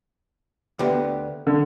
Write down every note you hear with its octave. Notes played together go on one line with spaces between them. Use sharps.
D2 D3 B3 G4
D3